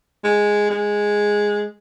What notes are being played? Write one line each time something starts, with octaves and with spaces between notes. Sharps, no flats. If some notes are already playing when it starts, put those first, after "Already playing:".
G#3
G#3